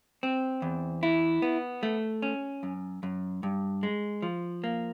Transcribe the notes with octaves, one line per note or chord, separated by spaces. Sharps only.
C4
E2
E4
B3
A3
C#4
F#2
F#2
G2
G#3
F3
A#3